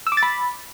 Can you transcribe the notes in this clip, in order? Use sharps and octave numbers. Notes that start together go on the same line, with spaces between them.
E6
D6
A6
B5